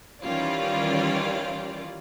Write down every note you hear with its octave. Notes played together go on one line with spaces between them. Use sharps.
D#3 E3 G3 C#4 F4 D5